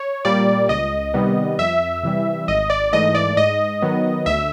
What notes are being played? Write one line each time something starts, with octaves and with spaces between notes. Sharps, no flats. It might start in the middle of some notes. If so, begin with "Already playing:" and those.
Already playing: C#5
A#2 G3 A#3 D5
C#2 D#5
C3 D#3 G3 B3
F2 E5
C3 E3 G3
G#1 D#5
D5
G#2 E3 A3 D#5
D5
G#2 D#5
D#3 F#3 B3
D2 E5